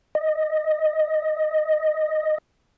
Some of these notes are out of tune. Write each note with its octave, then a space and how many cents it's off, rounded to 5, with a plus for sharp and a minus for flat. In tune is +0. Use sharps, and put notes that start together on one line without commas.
D#5 -5